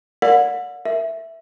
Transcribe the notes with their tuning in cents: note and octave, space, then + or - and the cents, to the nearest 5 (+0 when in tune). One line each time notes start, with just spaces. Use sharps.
A#4 +0 D5 -25 F#5 -35
A#4 +0 E5 +0